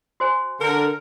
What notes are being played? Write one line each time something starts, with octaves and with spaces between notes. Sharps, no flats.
F#4 C5 G#5
D3 A#4